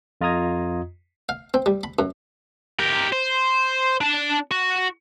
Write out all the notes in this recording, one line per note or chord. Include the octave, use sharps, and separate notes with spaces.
F2 F4 D#5 A#5 D#6 G#6
F5
C4
G3
B5
F#2
G4 A#4
C5
D4 A5
F#4